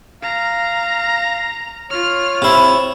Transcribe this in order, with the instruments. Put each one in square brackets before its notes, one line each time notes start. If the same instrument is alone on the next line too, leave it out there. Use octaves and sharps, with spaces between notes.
[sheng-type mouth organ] F5 [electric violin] A#5
[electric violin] F4 F6 [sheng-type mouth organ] C#5
[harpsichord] C3 E4